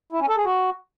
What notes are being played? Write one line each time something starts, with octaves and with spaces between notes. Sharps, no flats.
E4
C#4
A4
G#4
F#4